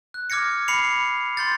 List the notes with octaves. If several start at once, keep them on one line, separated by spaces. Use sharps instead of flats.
F#6
D6 F6 G#6 A#6 C#7
B5 C7 C#7 F7
C6 G6 A6